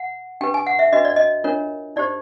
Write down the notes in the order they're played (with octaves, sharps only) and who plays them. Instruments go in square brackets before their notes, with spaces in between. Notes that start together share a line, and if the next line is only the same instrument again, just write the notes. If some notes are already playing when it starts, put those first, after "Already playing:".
Already playing: [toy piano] F#5
D4 G4 B4 G5
G#5
F#5
E5
D4 F#4 B4 D#5
D5
D#5
D4 F4 A#4 C#5
D#4 G4 C5 D5